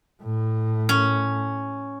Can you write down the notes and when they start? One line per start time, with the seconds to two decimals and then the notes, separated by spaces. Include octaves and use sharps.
0.23 A2
0.89 C#4